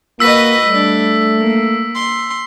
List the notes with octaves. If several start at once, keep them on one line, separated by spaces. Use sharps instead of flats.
A#3 F#4 B4 D#5 E6 B6
G3 A3 D4
A#3
C6